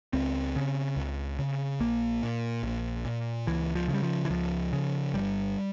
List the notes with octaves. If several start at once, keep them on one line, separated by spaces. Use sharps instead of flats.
C#2 C4
C#3
C#2
C#3
A#1 A#3
A#2
A#1
A#2
C#2 E3
F3
C#3
G3
F3
E3
C#2 F3
C#3
G1 G3